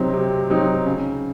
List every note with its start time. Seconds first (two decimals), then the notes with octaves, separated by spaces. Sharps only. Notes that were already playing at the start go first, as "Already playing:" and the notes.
Already playing: C3 F#3 C4 D#4
0.13 C3
0.50 F#3 C4 D#4
0.86 C#3